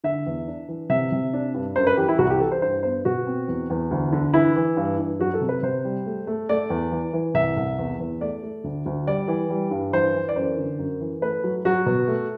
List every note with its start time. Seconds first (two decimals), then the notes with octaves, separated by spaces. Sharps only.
0.04 D3 E5
0.26 E2
0.48 D4
0.69 E3
0.89 C3 E5
1.12 C3
1.33 D4
1.54 G2
1.76 F#2 C5
1.87 B4
1.97 E3 G4
2.08 E4
2.19 C2 F#4
2.30 G4
2.40 E3 A4
2.52 C5
2.62 G2 C5
2.83 B3 C5
3.05 B2 F#4
3.27 C4
3.48 E2
3.70 E2
3.91 D2
4.12 D3
4.34 E3 E4
4.56 E3
4.77 G2
4.99 G2
5.20 F#3 F#4
5.34 A4
5.41 C3
5.49 B4
5.63 C3 C5
5.85 G3
6.06 A3
6.27 A3
6.49 A3 D5
6.70 E2
6.92 E3
7.13 E3
7.34 C2 E5
7.57 C2
7.78 E2
7.99 E2
8.21 A3 D5
8.43 A3
8.64 D2
8.86 D2
9.07 G3 D5
9.28 E3
9.50 G3
9.71 G2
9.92 E3 C5
10.14 E3
10.29 D5
10.36 F#2 C5
10.57 D3
10.79 F#2
11.01 E3
11.21 A3 B4
11.44 F#3
11.65 F#3 F#4
11.86 B2
12.08 A3